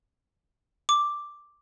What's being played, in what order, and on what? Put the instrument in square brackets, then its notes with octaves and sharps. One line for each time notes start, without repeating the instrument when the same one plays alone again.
[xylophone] D6